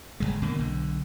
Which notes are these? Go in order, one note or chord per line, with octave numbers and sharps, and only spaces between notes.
G1 E2 G#3
B2 D3 A3 A#3
B1 D3